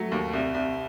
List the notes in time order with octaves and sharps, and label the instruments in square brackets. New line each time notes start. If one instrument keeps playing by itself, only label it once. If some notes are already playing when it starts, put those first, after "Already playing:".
Already playing: [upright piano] F#3 A3
D#2
C2
C2